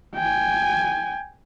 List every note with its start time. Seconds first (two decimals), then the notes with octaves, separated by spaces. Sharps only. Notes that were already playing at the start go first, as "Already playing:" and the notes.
0.15 G5 G#5